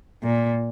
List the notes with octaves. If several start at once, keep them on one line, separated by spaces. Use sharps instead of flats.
A#2